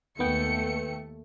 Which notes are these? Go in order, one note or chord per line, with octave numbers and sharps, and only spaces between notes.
D#2 D#3 A3 B3 G5 C#7